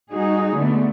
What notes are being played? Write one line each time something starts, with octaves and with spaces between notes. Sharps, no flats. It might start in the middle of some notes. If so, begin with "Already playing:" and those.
G3 D#4 F#4 G#4
D3 A3 B3